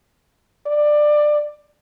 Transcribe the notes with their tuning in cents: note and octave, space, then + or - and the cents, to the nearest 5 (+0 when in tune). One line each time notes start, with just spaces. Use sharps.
D5 +20